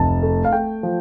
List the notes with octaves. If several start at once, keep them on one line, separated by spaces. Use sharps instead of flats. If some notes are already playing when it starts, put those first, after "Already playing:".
Already playing: F1 A5
A3
F5
A3 G5
F3